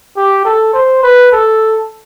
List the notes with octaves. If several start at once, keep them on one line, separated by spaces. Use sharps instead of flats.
G4
A4
C5
B4
A4